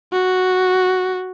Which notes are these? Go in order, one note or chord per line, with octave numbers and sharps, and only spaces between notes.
F#4